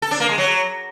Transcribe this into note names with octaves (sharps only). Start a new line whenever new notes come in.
A4
D4
A#3
G#3
F#3